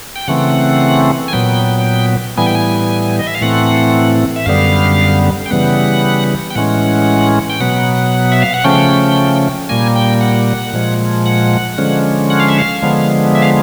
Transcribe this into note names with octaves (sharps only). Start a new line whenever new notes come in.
G5
C#3 E3 A3 C4 F#5
G#5
A#2 F#3 B3 G5
A2 E3 G3 B3 G#5
G5
G#5
D#5
E5
F5
A2 E3 A3 C4 F#5
E5
F#2 D3 G3 B3 F5
G5
C#3 E3 G3 B3 F#5
G5
A2 E3 G#3 C#4 F#5
G5
B2 F#3 B3 F#5
E5
F5
F#5
C#3 F3 A3 C#4 G5
A#2 G3 A#3 G#5
G5
F#5
A#2 F3 G#3
F#5
D3 F3 G#3 C#4
F#5
F5
E5
F5
D3 F3 G#3 B3
E5
F5